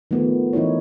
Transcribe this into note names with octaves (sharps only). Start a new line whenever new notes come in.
D#3 F3 A3 B3
E3 D#4 E4 C#5